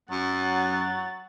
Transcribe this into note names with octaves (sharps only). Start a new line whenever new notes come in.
F#2 F#3 F#5 A6